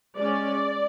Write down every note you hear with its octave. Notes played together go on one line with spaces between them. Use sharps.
G#3 C#4 D5